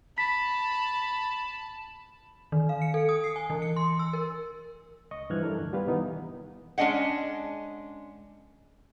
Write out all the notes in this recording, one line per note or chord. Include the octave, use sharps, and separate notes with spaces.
A5 B5 B6
D#3
F5
C#7
A4
D#6
C7
G#5
E3
C#7
C6
E6
A#4
C#2 D#5 C#6
G2 E3 F3 F6 F#6 G#6
D4 E4 A4 A#4
D2 G2
G3 B3 F4 G4 B4 F5
B2 D#3 E3 B3 D#4
G#3 C#4 D4 D#5 F#5